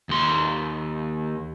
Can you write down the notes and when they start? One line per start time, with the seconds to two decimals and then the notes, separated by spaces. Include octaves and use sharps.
0.09 D#2 C6